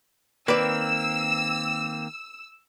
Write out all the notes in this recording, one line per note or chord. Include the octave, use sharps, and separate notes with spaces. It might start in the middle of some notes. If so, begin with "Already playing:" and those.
D#3 A#3 C4 B4 D5 E6